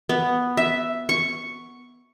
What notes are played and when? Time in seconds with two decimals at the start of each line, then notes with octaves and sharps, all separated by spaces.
0.09 B3
0.57 E5
1.09 C#6